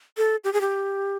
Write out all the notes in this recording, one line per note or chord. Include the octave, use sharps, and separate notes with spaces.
A4
G4
G#4
G4